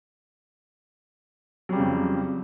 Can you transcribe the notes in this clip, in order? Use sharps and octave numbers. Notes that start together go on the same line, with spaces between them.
F2 C#3 F#3 G3